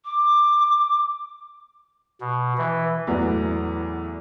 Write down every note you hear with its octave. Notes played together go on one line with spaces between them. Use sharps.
D6
B2
E3
E2 A2 E3 F#3 B3